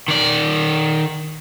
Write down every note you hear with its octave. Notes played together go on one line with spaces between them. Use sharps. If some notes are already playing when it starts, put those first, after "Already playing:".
D#3 D5